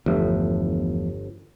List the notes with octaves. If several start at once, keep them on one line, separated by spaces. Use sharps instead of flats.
G1 E2 F3 A3